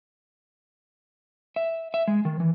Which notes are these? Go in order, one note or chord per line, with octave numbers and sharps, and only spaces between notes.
E5
E5
G#3
D#3
E3